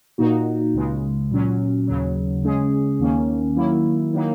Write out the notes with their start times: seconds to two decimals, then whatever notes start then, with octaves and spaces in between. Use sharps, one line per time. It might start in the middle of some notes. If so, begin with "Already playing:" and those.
0.18 A#2 A#3 D#4 F#4
0.74 C#2 C#3 G#3
1.31 A#2 F#3 C#4
1.87 D#2 C#3 F#3
2.43 C#3 G#3 C#4 G#4
3.00 D#2 D#3 A#3 C#4
3.56 D#3 F#3 A#3 E4
4.13 D#3 F#3 A#3 D#4